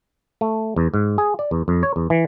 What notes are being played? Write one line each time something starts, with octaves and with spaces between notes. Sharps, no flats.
A3
E2
G#2
G#4
D5
E2
F2
C#5
E2
E3